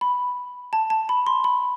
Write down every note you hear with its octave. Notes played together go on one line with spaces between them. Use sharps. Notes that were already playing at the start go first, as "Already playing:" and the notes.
B5
A5
A5
B5
C6
B5